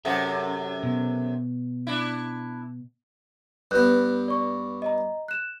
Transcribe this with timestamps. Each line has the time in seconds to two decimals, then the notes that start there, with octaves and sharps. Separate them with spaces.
0.05 F#2 C3 A4 E5 F#5
0.83 B2
1.87 D4 E4
3.71 G2 B3 B4 F#6 G6
4.28 D5 C#6
4.82 D#5 A#5
5.28 F#6 E7